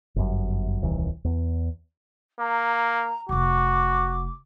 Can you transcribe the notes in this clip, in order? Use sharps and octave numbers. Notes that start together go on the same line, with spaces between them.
G1 F#2
D#1 C2 E3
E2
A#3 A#5
F1 C3 F#4 D6